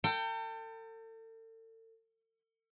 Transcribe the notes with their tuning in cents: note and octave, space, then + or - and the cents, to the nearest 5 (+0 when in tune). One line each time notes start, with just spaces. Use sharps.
A4 +40 G5 +0